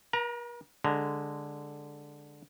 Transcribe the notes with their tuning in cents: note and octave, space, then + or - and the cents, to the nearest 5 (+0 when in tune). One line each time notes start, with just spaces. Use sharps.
A#4 +45 A#5 +0
D3 +0 G#3 -10 A#5 +0